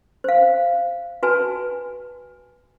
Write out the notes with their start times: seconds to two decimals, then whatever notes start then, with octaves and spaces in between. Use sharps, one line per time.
0.24 C5 F5
1.23 F#4 B4 G#5 A5